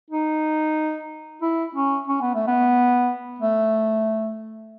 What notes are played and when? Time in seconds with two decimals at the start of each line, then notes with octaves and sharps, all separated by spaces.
0.11 D#4
1.42 E4
1.75 C#4
2.08 C#4
2.22 B3
2.34 A3
2.47 B3
3.40 A3